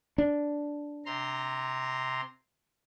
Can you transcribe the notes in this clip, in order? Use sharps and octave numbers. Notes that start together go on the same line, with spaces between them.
D4
C3 A#5 C6